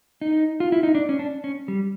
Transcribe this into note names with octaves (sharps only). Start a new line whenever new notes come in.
D#4
F4
E4
D#4
D4
C#4
D4
C#4
G3